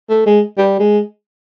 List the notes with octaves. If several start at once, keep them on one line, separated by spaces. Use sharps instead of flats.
A3
G#3
G3
G#3